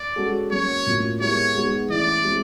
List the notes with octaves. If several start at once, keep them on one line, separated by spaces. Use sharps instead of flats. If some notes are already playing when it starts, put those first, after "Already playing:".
Already playing: D5
G#3 C#4 F#4 A4
F#3 A#3 C#4 C#5
A2 F#3 A#3 C#4 F4
G#3 B3 E4 G4 A#4 C#5
G#3 B3 D#4 G#4
E3 A3 C#4 E4 D5
G#3 C4 E4